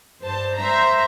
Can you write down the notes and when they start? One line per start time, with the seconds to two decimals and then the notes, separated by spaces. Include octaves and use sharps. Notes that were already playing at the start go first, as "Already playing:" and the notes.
0.20 G2 C5 A5
0.56 C5 E5 A#5